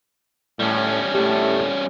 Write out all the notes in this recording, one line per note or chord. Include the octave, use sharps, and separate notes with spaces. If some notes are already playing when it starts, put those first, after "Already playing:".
A2 G3 C#4
A2 A3 G4